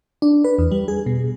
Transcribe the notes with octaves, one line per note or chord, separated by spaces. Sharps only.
D4
B4
E2
G3
G#4
B2